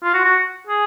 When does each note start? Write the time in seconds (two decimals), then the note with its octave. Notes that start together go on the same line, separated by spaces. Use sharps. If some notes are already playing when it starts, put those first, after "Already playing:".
0.03 F4
0.14 F#4
0.25 F#4
0.67 G#4